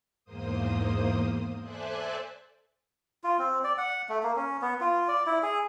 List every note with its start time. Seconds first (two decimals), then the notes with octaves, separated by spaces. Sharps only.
0.25 E2 G#2 A#3 C5 D#6
1.63 A4 C5 D5 E5 G#5 F#6
3.24 F4
3.39 C4
3.64 D5
3.78 F#5
4.09 A3
4.23 A#3
4.36 C#4
4.62 B3
4.81 F4
5.08 D5
5.26 E4
5.43 G#4